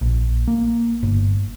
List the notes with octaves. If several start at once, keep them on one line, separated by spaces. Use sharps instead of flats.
A#1
A#3
G1